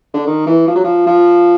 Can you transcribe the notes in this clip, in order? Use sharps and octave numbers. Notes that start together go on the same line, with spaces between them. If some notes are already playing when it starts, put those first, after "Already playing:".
D3
D#3
E3
F3
F#3
F3
F3